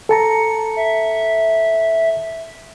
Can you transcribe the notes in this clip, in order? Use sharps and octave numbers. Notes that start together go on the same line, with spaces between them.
A4 A5 A#5 C#7
E5